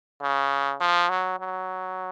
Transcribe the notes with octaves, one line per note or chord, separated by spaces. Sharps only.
C#3
F3
F#3
F#3